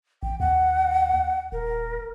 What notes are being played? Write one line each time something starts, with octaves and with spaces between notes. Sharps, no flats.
A1 G5
D#2 F#5
D#1 A#4